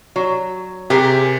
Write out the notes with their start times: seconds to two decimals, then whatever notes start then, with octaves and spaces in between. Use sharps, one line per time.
0.16 F#3
0.90 C3 G4 G#4 A#4